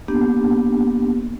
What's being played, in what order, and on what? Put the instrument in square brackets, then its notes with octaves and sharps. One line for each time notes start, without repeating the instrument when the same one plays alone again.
[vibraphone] A#3 B3 D4 G4